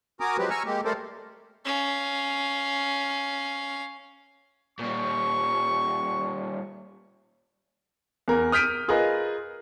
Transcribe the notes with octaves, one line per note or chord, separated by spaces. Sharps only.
F#4 A#4 G#5 A#5 D6 D#6
F3 F#3 G#3 C4 G4 B4
G#5 A#5 C#6 E6 F6
G#3 A#3 G4
G3 A3 A4 A#4 C5 D5
C#4 F5
A#2 G3 C#6
E2 A#4
D#6 F6 G6 B6 D7 D#7
F4 G#4 A#4 B4 D#5